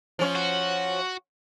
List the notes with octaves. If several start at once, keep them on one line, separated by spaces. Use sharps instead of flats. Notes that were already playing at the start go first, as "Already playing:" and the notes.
F3 C#4
F#4